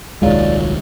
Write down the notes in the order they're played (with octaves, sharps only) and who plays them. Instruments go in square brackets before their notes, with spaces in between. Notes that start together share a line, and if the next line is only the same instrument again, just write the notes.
[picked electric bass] D#1 C2 D#3 [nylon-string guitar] F#3 F4 [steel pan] G#3 [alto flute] D5